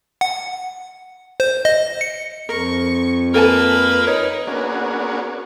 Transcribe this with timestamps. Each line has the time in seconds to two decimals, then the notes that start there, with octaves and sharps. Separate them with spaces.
0.21 F#5
1.40 C5
1.65 D#5
2.01 C#7
2.49 F2 A#4 C#6
3.34 A#3 A4 B4 G#5 A5
4.07 D#4 C#5
4.47 A#3 B3 C#4 D4 F#4 G#4